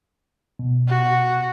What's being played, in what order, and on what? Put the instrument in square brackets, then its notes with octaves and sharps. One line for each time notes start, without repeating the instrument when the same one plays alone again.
[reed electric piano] B2
[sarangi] F#4